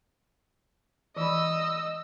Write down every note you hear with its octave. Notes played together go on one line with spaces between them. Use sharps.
E3 D#5 B5 E6